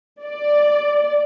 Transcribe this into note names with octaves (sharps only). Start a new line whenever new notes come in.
D5